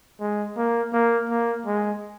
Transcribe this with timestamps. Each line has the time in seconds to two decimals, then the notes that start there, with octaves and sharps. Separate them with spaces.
0.20 G#3
0.57 A#3
0.93 A#3
1.30 A#3
1.66 G#3